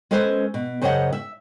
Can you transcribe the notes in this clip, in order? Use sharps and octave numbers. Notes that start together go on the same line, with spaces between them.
G#3 C#4 A4 B4 C5
B2
F#2 C#3 C5 C#5 D#5 F#5
E5